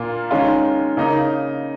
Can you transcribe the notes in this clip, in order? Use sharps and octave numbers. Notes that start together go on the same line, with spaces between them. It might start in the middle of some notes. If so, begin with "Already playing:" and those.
Already playing: A#2 A#3 F4
D#3 G#3 C#4 F4
C#3 A#3 D#4